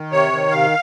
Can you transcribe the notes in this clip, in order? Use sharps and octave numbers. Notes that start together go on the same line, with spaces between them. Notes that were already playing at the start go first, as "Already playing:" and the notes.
Already playing: D#3
C3 C#5
D#3
C3 F5